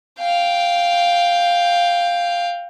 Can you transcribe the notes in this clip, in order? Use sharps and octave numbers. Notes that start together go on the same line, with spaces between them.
F5 G5